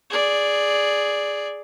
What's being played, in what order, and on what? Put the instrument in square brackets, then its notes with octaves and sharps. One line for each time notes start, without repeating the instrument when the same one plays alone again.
[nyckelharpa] G#4 D5